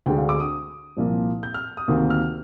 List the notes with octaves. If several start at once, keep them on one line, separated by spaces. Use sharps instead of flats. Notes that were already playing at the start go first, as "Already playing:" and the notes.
D2 D3 G#3 G5
F5
D6
D#6
C2 A#2 F3 A#3
G6
F6
D#6
D2 C3 D#3 A#3
F6